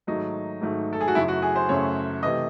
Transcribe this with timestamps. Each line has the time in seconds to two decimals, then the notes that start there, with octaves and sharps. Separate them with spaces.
0.07 G#2 D#3 F#3 A3 D#4
0.61 G#2 D#3 F#3 A3
0.93 A4
1.01 G#4
1.08 F#4
1.15 F#2 C#3 F#3 A3 E4
1.28 F#4
1.42 G#4
1.56 C5
1.69 F#2 C#3 F#3 A3 C#5
2.23 C3 E3 A3 D#5